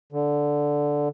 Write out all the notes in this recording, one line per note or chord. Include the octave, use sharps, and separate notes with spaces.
D3